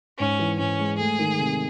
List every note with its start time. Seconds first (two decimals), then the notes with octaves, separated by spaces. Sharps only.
0.19 G#2 C#4
0.39 E3
0.59 G#2 C#4
0.79 G#3
0.99 A3 G#4
1.19 D#3
1.39 C3